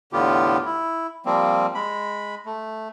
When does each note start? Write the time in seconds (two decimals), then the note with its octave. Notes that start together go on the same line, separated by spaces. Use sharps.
0.13 E2 A2 D3 B3 F4 G4
0.65 E4
1.26 F3 G3 A#3 C4
1.75 G#3 B5
2.46 A3